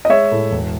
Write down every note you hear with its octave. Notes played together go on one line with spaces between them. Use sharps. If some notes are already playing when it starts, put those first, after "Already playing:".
D#5
G#3 C#5 E5
A2
E1